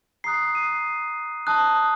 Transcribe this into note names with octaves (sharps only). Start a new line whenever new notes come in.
A#5 D#6 F#6 C7
D#7
A5 D#6 F#6